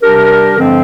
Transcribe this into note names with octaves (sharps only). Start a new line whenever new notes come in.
C3 G3 D4 G4 A#4
G2 D3 F3 G#3 C4